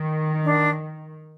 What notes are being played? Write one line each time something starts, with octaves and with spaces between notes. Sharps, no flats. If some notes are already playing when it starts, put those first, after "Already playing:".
Already playing: D#3
D4